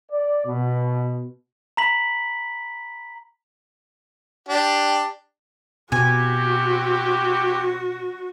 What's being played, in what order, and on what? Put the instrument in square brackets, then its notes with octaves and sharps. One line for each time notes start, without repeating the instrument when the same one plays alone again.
[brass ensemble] D5
B2
[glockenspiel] A#5 B5 B6 F#7
[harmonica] D4 G4
[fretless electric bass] B2 [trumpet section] C4 E4 G4 [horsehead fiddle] F#4 [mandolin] G#5